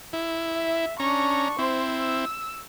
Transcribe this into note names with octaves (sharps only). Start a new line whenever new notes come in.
E4
E5
C#4 D4 A#5 C#6
C4 E4 C5
E6